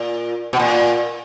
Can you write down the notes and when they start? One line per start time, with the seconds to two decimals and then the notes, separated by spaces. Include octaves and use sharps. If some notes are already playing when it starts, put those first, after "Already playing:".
Already playing: A#2
0.53 B2
0.59 A#2